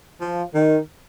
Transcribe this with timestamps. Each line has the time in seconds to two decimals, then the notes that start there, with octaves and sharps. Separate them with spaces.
0.21 F3
0.55 D#3